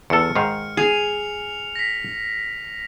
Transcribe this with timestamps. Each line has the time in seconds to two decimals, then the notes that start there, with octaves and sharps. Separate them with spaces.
0.10 E2 A4 F6 C#7
0.35 G#2 D#3 F5
0.77 G#4 C7 F7
1.75 A#6 B6